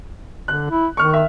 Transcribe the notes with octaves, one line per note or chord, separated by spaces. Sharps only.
D3 F#6
E4
D#3 C#6 F6
E5